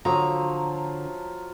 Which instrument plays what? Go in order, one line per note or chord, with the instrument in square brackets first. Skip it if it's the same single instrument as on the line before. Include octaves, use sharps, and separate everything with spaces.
[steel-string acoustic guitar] D3 A#5 [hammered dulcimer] F3 F#3